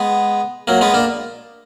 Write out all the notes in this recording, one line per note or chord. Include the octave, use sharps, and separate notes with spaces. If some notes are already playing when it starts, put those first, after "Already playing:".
Already playing: G#3 B3
F#3 A#3
G#3 B3
A#3 D4